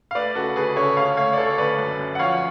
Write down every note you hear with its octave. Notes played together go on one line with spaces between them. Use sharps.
F5
A3 B4 D5
C#3 F#4 A4
D2 G#4 B4
C#3 A4 C#5
D2 C#5 F5
A3 C#5 F5
D5
D2 A4 C#5
D2 B4 D5
F#2
F#2
F#5
F3 C#5 F5
C#5